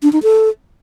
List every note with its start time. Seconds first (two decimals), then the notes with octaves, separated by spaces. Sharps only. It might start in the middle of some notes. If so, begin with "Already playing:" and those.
0.03 D4
0.13 D#4
0.23 A4